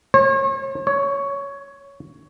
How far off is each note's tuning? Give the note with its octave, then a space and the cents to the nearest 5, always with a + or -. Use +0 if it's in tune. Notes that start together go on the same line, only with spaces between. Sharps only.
C#5 -40
C#5 +10